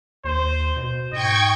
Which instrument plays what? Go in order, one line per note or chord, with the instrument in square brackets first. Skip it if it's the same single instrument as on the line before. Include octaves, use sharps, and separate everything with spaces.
[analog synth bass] D#2 [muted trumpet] C5
[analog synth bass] B2
[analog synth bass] G#2 [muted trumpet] D#5 [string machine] G5 C#6 G#6